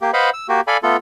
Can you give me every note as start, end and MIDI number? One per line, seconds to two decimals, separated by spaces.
0.01 0.11 58
0.01 0.11 67
0.13 0.30 71
0.13 0.30 72
0.13 0.30 75
0.13 0.30 77
0.13 0.30 78
0.13 0.30 83
0.34 0.47 88
0.49 0.61 58
0.49 0.61 66
0.49 0.61 67
0.67 0.77 69
0.67 0.77 74
0.67 0.77 77
0.67 0.77 80
0.67 0.77 83
0.83 0.97 57
0.83 0.97 59
0.83 0.97 65
0.83 0.97 69